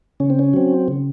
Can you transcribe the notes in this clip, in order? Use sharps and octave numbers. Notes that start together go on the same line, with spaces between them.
C#3 C#4
C4
C#4
F#3 C4
C#3